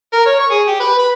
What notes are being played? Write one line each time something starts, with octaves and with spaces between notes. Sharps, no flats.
A#4
C#5
C#6
G#4
G4
B4
B5